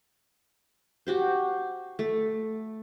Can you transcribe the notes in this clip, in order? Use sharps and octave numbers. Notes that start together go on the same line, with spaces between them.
F#4 G4 C5
A3